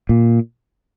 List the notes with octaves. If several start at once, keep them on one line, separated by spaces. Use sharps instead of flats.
A#2